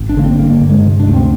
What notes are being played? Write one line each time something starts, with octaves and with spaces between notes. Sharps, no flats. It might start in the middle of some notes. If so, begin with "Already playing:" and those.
Already playing: G#1
D4
D3 A#3
C4
G2 A#3
G2
G#3
C3
D4
D2
C4